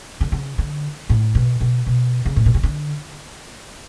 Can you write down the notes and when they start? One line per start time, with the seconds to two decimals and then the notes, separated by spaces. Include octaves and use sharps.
0.21 D3
0.32 C#3
0.58 D3
1.10 A2
1.35 B2
1.61 B2
1.86 B2
2.25 C#3
2.36 A2
2.46 B2
2.54 C#3
2.63 D3